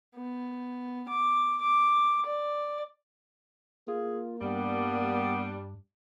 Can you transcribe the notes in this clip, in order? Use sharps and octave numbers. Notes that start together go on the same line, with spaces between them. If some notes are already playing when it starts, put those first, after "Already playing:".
B3
D6
D6
D5
A#3 F4 G#4
G2 G3 B3 D4